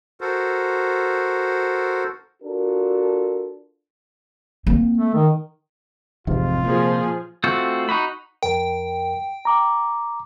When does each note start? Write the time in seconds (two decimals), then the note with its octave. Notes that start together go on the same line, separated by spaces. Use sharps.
0.21 F#4 A4 A#4 C5
2.43 D4 F4 F#4 A4 A#4
4.67 A#3 C4
4.98 A3
5.14 D#3
6.27 A1 F2 G#2 C3 F4
6.65 A#2 F3 G#4
7.44 A3 C4 F4 F#4
7.89 D#4 F#4 B5
8.43 F2 A#4 G5
9.45 A#5 D6